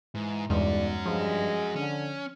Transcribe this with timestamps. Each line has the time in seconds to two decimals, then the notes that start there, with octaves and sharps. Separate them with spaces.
0.15 G#2 E3
0.50 B1 E2 G2 G#3 C#4 F#4 D5
1.06 G2 F3 G#3
1.76 D3 C#4